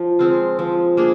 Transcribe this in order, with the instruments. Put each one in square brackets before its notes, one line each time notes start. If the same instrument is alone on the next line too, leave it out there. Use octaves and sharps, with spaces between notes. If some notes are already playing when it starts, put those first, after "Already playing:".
Already playing: [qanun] F3
G#3 C4 F4
F3
A#3 D4 G#4